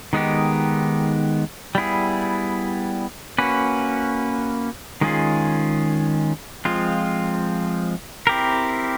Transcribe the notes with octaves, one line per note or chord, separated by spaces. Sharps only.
D#3 G#3 B3 D#4 G4
G3 B3 E4 G#4
A#3 C#4 F#4 B4
D#3 G#3 C#4 F4 G#4
F3 G#3 C4 F4
C4 E4 G4 A#4